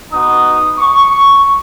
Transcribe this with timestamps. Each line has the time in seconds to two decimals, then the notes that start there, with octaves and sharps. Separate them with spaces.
0.12 B3 D#4 F#4 D#6
0.78 C#6